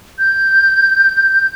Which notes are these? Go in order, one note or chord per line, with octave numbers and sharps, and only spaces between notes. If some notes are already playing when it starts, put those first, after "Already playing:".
G6